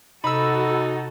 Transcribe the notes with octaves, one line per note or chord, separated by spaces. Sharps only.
C3 D#4 F#4 A4 B5 E6